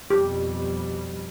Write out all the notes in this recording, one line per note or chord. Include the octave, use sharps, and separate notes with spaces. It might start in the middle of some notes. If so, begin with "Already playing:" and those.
F2 B2 G3 G4